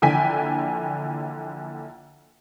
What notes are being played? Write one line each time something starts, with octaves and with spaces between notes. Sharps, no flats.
A#1 D3 E3 G5 G#5 B6